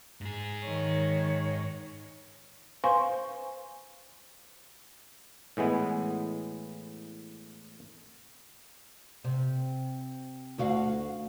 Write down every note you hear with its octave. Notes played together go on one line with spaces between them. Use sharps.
G#2 G#4
D#3 C#5
B4 C5 F5 G#5 C6 C#6
A2 E3 G#3 B3
C3
D2 F#4 F5